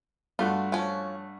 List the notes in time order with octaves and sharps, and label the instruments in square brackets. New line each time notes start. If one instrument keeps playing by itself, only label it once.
[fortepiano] G2 A3 F#4 [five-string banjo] F4
[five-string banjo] F3 C#4